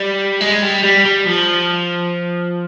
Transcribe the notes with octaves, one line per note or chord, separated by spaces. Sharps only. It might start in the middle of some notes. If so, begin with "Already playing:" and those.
Already playing: G3
G#3
G3
G3
G3
F3